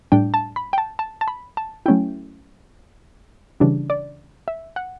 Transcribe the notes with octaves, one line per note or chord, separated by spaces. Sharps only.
A2 G3 D4 G5
A5
B5
G5
A5
A5
A5
B5
A5
F#3 A3 C#4 E4 G5
C#3 E3 G3 D4
D5
E5
F#5